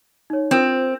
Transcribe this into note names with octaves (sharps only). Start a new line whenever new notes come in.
D#4 C#5
C4 F4 A#4 C5